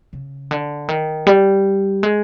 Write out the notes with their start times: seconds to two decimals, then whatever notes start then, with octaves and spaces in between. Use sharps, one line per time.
0.13 C#3
0.51 D3
0.89 D#3
1.27 G3
2.03 G#3